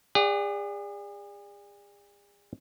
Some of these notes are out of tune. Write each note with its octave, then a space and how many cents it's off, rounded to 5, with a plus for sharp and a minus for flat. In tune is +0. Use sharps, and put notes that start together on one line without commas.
G#4 -40 D5 +0 F#5 +25